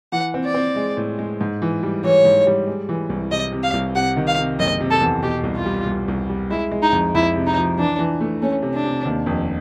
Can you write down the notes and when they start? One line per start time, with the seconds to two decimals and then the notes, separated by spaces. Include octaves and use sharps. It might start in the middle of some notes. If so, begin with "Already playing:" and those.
0.12 E3 F#5
0.34 C4
0.44 D5
0.54 C4
0.76 G#3
0.97 A2
1.19 G#3
1.41 G#2
1.62 E3
1.83 G3
2.04 E3 C#5
2.25 G#2
2.47 G3
2.67 G#3
2.89 E3
3.10 C2
3.31 C3 D#5
3.52 C3
3.63 F5
3.73 C2
3.95 C3 F#5
4.16 D#3
4.27 F5
4.38 C3
4.59 F#1 D#5
4.80 C3
4.91 A4
5.01 E2
5.23 B2 G4
5.43 C2
5.55 F4
5.66 G3
5.86 C2
6.08 C2
6.29 G3
6.50 G#3 E4
6.72 G#3
6.82 D#4
6.92 F2
7.14 F2 E4
7.36 C3
7.47 D#4
7.57 F3
7.78 E3 D4
7.99 E3
8.21 A3
8.42 A3 C#4
8.62 C3
8.74 D4
8.84 C3
9.05 D#2
9.26 F1